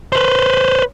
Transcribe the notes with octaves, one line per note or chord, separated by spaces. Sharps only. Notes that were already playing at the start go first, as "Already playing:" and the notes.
B4 C5